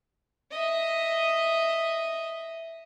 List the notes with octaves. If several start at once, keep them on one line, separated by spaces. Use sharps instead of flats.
D#5 E5